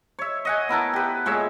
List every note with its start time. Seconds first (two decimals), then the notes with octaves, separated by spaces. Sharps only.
0.19 C#5 E5
0.45 D#5 F#5 G#5
0.69 B3 E4 A#4 A5
0.93 G4 B4
1.26 A#2 G#3 C#5 E5